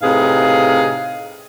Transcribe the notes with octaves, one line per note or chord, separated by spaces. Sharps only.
A2 C3 D#4 G#4 B4 F5